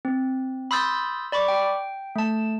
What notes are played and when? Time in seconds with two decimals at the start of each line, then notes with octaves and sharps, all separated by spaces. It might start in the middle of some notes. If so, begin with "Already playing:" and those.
0.05 C4
0.71 B5 C6 D#6 E6 G6 A6
1.32 D5 B5 C#6 D6
1.48 G5
2.16 A3 A5